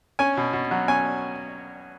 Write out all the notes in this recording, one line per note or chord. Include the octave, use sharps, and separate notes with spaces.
C#4 G#5
B2
B2
F#3
C#4 G#5